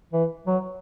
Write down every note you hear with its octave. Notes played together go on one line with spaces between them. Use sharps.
E3
F#3